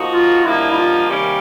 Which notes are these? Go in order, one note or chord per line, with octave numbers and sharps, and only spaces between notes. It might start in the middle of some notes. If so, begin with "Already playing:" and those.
Already playing: F3 A#3 D#4 F#4
F4
G2 D3 F3 A#3 D#4 E4
E4
F4
C3 D#3 G3 A#3 C#4